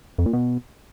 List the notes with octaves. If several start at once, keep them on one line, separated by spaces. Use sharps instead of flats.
F2
A#2
B2